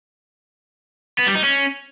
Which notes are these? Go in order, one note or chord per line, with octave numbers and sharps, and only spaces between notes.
B3
G3
D#4
C#4